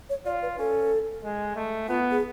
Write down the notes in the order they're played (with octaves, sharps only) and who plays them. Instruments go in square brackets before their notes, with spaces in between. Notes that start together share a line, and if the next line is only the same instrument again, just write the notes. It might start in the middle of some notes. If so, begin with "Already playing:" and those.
[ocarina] C#5
[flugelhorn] F4 [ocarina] D5
[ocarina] B4
[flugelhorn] C#4 [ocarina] A4
[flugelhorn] G#3
A3
[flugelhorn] B3 [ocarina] F4
[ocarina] G#4